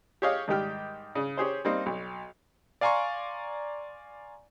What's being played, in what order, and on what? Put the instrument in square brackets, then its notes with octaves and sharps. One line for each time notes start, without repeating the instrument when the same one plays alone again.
[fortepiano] G4 G#4 C#5 D#5 F5
G#2 D#3 G3 G4 G5 F6
C#3
C#4 G4 G#4 C5
G3 A#3 C4 D#4
B1
[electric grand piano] D5 F5 G#5 A#5 C6 C#6